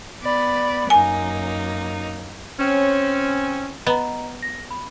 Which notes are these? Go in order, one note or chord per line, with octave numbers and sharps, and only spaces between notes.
B3 D5 B5
F#2 A#3 D#4 G#5
C4 C#4
B3 D#5 A#5
A#6
B5